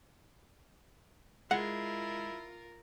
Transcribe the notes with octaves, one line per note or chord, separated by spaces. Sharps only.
G#3 E4 F4 A#4 F#5